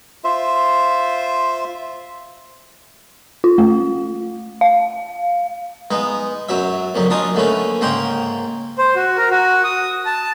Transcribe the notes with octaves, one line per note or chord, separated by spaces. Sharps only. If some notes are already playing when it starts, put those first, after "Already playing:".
F4 C5 E5
F4
A3
F5
G#3 B3 D#4
F#2 F#3 E5
F2 A#2 C#3 F#3
D4 D#4 F4 D#5 G#5
D3 A3 A#3 C#4 B4
G#2 C#3 A#3 A#4 G5 C6
C5
F#4
A#4
F#4
D#6
A5